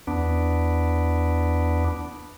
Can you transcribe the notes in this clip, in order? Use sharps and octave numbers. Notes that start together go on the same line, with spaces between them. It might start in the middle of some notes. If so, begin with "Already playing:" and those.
E2 B3 D4